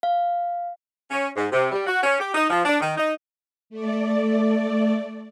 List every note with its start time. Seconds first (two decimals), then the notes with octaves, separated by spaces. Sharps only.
0.03 F5
1.11 C#4
1.36 G#2
1.52 C3
1.72 G3
1.87 F#4
2.03 C#4
2.20 G4
2.34 D#4
2.50 F3
2.65 D4
2.81 D#3
2.97 D#4
3.70 A3 D5